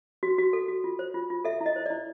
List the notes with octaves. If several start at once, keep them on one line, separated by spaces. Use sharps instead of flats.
F#4
F#4
A4
F#4
F4
C5
F4
F4
A4 E5
E4
D#5
C5
D5
E4